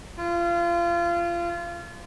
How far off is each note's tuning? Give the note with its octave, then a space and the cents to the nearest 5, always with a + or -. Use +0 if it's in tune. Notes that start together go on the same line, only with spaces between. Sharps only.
F4 -25